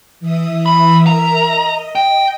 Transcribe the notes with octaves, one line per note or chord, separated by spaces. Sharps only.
E3 E5 D#6
B5
A#4 E5 A#5
D#5
G5